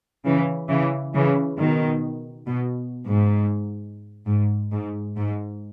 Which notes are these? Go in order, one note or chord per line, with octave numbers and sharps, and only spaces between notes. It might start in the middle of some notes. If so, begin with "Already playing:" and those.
C#3 E3
C#3 E3
C#3 E3
B2 D#3
B2
G#2
G#2
G#2
G#2